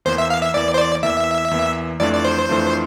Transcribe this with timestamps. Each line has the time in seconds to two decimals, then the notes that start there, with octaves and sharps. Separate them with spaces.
0.05 E2 E3 A#3 C5
0.18 E5
0.30 F5
0.42 E5
0.54 E2 E3 A#3 D5
0.74 C5
0.78 D5
1.03 E2 E3 A#3 E5
1.51 E2 E3 A#3
2.00 F2 E3 A3 D4 F4 D5
2.13 D5
2.25 C5
2.49 F2 E3 A3 D4 F4